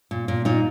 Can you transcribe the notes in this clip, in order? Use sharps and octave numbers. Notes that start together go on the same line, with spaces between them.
A#2
A#2
A#2 D#4